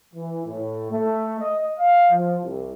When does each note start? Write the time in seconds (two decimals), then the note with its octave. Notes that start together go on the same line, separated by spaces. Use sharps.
0.14 E3
0.46 A2
0.91 A3
1.39 D#5
1.78 F5
2.11 F3
2.44 C2